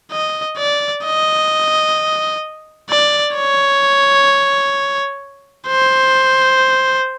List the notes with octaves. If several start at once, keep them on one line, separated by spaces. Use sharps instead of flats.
D#5
D5
D#5
D5
C#5
C5